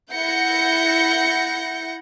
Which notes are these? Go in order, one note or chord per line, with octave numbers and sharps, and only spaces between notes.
E4 F#5 G6 A#6 C#7